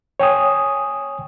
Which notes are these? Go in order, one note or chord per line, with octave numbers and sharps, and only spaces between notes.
C#5 G5 G#5 D#6